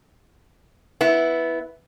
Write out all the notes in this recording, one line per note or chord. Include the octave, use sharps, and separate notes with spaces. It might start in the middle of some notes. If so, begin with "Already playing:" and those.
B3 E4